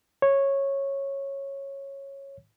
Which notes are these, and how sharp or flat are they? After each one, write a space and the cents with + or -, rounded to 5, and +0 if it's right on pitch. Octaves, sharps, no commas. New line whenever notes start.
C#5 -10